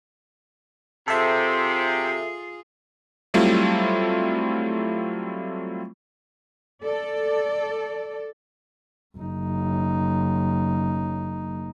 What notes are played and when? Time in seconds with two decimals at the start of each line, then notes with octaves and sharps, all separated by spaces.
1.08 C3 F4 G#4 A4 E5
3.34 F#3 G3 A3 C4 E4 F4
6.82 A4 D5
9.18 F#1 D#4